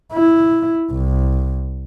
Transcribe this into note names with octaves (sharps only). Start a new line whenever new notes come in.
E4
C2